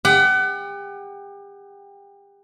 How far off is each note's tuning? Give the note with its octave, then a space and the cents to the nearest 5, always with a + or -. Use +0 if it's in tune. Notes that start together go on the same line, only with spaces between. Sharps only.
G4 +35 F#5 +35